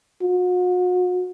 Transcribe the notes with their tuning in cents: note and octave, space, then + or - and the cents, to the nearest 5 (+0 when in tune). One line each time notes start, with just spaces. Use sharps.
F#4 -40